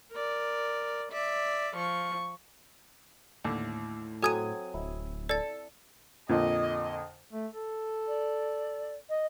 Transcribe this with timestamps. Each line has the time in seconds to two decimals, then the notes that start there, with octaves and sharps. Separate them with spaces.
0.12 A#4 D5
1.12 D5 E5
1.76 F3 C#6
3.44 D#2 A2 D3
4.23 F#3 C4 A4 G#5 D#6 G#6 D#7
4.74 D1 E4
5.29 A4 D5 A6
6.29 F2 A#2 D3 D#5
7.32 A3
7.54 A4
8.08 D5
9.09 D#5